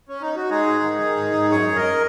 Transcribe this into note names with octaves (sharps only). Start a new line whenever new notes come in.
C#4
D#4
F#4
G#3 D#4 G#4
G#2
D#3
D#3
G#2
G#2
F#2 G#4 C#5
F#2
A#4 D#5